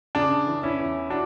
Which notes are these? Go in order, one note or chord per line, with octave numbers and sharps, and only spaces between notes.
C#3 D4
E3
C#4 E4
E2
D4 F#4